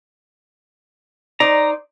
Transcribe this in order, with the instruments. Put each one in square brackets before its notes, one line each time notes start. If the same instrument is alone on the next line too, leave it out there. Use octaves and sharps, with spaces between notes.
[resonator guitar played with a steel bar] D#4 C5 D5 [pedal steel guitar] A#5